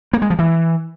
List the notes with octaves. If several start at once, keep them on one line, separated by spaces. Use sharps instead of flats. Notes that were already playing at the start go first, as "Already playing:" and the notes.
A#3
G#3
F3
E3